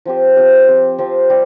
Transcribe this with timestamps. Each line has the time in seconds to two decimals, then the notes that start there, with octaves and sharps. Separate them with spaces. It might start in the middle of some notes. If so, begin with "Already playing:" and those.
0.05 F3 C4 G4 C5
0.37 F3 C4 G4 C5
0.68 F3 C4 G4 C5
0.98 F3 C4 G4 C5
1.30 G3